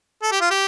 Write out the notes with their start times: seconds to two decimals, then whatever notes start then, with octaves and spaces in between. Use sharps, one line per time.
0.23 A4
0.32 G4
0.41 F4
0.51 G4